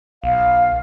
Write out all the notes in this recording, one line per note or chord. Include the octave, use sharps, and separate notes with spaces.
B1 F5